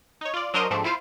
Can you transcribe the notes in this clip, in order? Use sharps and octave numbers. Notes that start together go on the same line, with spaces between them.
D#4 C#5
F4 D5
F#3 D4 A#4 C5 D#5
G#2 F3 A3 C4 D4
E4 F4 C5 F5